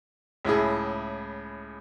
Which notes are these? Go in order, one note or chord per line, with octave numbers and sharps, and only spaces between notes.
C#2 A2 E4 G#4